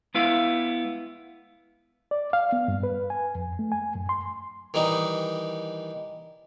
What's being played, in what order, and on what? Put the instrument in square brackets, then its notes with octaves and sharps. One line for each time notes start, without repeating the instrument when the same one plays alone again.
[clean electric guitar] G#3 B3 E4 F5
[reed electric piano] D5
F5
B3
G2
B4
G#5
F2
A3
G#5
F#2
C6
[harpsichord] D#3 E3 G3 D#4